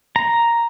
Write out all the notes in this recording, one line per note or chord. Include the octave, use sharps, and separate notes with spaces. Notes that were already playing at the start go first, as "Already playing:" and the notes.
A#5